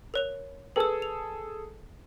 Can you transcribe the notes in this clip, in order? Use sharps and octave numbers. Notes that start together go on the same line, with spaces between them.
A#4 C#5 F7
G#4 A4 B4 E6
F7